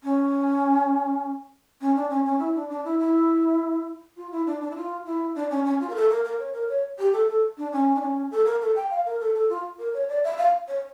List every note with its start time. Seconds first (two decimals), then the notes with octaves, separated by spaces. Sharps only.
0.04 C#4
1.81 C#4
1.96 D4
2.10 C#4
2.25 C#4
2.39 E4
2.55 D4
2.70 D4
2.85 E4
2.99 E4
4.17 F4
4.32 E4
4.46 D4
4.62 D4
4.71 E4
4.76 F4
5.06 E4
5.36 D4
5.50 C#4
5.65 C#4
5.80 F4
5.89 A#4
5.95 A4
6.10 A#4
6.25 A#4
6.39 C#5
6.54 A#4
6.69 C#5
6.99 G4
7.13 A4
7.28 A4
7.58 D4
7.72 C#4
7.96 D4
8.02 C#4
8.31 A4
8.46 A#4
8.61 A4
8.76 G5
8.91 F5
9.06 A#4
9.20 A4
9.35 A4
9.49 F4
9.79 A#4
9.94 C#5
10.09 D5
10.24 E5
10.38 F5
10.68 C#5